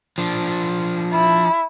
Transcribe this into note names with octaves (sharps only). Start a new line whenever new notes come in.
F3 D4
E4